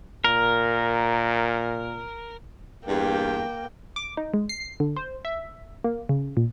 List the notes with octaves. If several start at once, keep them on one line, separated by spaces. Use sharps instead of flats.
A#2 A#4
E2 G2 A#3 G5
D6
D#4
G#3
C7
D3
C5
E5
A#3
C#3
A#2